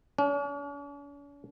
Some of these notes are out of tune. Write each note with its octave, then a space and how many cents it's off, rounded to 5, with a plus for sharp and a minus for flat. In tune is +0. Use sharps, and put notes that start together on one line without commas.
C#4 +45